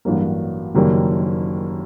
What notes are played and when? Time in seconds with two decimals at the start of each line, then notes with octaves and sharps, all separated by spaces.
0.05 A1 G2 F#3 A#3
0.75 F#1 F#2 D#3 G3 A#3